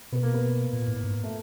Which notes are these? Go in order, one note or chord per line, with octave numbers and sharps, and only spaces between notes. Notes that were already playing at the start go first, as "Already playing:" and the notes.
B2 B3
A#3
B3
A#2
A2
G#2
A3